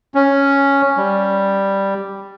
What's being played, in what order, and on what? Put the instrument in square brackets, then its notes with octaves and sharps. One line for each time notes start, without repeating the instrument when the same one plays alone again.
[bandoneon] C#4
G3